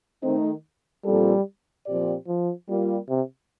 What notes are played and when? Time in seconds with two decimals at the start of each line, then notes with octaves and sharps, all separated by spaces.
0.23 D#3 A3 C4 D#4
1.05 A#2 F3 G3 C4 F4 A4
1.86 A#2 F3 C4 G4 D5
2.27 F3
2.69 G3 A#3 F4
3.09 C3